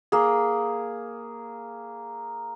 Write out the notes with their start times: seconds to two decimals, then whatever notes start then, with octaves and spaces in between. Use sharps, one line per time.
0.12 A#3 G#4